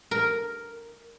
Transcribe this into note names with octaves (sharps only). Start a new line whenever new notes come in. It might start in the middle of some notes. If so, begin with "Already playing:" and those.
A#4